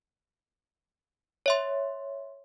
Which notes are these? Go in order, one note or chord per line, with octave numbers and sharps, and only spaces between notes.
C#5 E5 C6